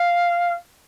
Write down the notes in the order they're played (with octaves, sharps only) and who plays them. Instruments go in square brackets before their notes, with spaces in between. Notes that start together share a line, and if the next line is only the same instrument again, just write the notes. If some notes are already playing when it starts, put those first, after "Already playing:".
Already playing: [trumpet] F5